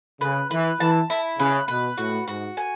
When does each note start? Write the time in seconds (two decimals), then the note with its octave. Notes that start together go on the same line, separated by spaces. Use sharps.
0.21 C#3 B4
0.50 E3 B4
0.80 E3 A5
1.10 E4
1.39 C#3 B4
1.68 B2 B4
1.98 A2 F#4
2.27 G#2 F#4
2.57 G#5